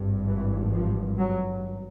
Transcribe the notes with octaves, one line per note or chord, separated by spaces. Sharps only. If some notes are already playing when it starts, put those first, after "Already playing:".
Already playing: G#1 G2
E3
F3
F#3